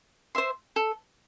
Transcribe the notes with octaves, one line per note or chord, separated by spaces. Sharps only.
C5 E5 C6
A4